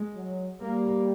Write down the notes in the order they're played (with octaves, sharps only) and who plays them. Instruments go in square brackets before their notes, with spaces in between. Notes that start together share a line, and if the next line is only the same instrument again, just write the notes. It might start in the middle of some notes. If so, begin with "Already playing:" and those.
Already playing: [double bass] G#3
[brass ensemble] F#3
[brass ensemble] G3 [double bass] A#3